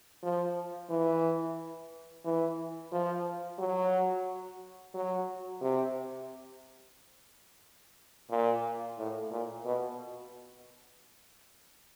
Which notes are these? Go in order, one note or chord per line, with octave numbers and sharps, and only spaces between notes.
F3
E3
E3
F3
F#3
F#3
C3
A#2
A2
A#2
B2